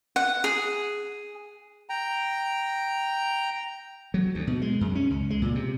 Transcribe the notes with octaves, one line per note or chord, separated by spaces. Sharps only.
F#5
G#4
G5 A#5
F#3
D2
B2
G#3
F#2
C#4
C#2
G#3
A#2
C3